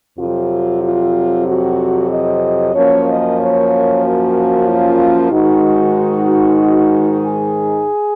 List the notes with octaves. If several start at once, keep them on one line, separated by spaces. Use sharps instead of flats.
F2 C3 F#3 F4
F4
F#4
D#5
F#2 F3 A#3 C#4 C#5
D#5
C#5
F#4
F4
G#2 D#3 G#3 D#4 F#4
G#4